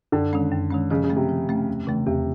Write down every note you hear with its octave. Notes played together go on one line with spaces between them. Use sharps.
F#2 D3
D#3 G#3 C#4
F#2
D#3 G#3 C#4
C#3 F3
C#3
A3 C#4
C3
F3
A3 C#4
E2
C#3 E3 A3 D4
E2 C3